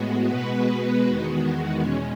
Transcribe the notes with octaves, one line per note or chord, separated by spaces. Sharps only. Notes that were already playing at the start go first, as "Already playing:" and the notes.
Already playing: A2 G#3 B3 F#4
B2 G#3 B3 F#4 B4
E2 D#3 G#3 B3 F#4
E2 B2 G#3 C#4